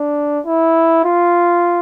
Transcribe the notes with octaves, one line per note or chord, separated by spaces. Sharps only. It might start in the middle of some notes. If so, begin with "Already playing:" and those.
Already playing: D4
E4
F4